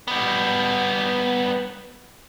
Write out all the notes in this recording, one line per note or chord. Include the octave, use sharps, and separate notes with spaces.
G3 B3